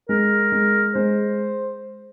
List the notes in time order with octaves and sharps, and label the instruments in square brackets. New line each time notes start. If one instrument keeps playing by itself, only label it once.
[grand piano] G#3 [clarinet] A#4
[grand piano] G#3
[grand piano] G#3 [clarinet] C5